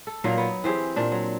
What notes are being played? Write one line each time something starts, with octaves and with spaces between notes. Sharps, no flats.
A4
A#2 F#3 A#3 D#4
B3
E3 C4 G4 G#4
A#2 D4 D5
F#3